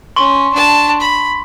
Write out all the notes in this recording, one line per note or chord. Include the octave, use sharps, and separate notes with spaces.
C#4 C6 C#6
D4 A5
B5